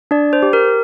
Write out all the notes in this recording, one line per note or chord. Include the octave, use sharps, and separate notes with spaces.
D4 D5
C5
G4
A#4